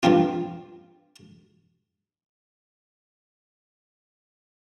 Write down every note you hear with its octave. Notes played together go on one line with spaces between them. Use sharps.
G2 F3 C4 F4